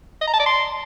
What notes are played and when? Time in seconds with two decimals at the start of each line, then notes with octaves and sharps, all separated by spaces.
0.21 D#5
0.27 A#5
0.33 A5
0.40 D5
0.46 C6